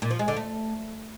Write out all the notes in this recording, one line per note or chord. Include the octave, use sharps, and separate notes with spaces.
A#2
F3
G#3
D3
A3